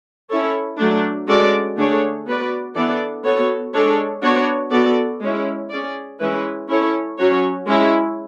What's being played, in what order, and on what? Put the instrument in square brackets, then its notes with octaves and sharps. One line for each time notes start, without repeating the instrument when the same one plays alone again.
[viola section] C#4 E4 A4 C#5
F#3 A3 D4
G#3 C#4 F#4 A4 D5
D3 A3 D4 G#4 C#5
B3 F#4 B4 D5
E3 B3 D4 A4 D5
B3 F#4 A4 C#5
G#3 D4 A4 C#5
B3 D4 F#4 C#5
B3 F#4 A4 D5
G#3 C#4 E4
C#4 G#4 D5
E3 G#3 C#4 E4 B4
C#4 E4 A4 C#5
F#3 C#4 F#4 C#5
G#3 C#4 E4